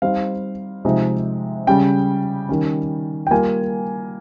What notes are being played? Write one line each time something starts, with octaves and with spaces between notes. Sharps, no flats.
G3 C4 D#4 F5
C3 F3 G#3 D#4
C#3 G3 C#4 G5
D#3 G3 C#4
G5
G3 A#3 F4 G#5